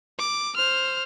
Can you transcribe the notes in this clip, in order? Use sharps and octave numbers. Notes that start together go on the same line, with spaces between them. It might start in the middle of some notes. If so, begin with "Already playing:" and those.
D6
C5 F6